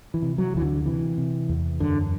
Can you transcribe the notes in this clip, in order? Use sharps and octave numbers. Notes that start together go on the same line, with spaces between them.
E3
C3
F#3
D2 E3
D3
C3 E3
C3
E2
F#2 D3